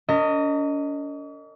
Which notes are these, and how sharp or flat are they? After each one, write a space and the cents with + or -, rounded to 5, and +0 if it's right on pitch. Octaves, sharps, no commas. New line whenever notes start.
C#4 +45 A#4 -40 D#5 +0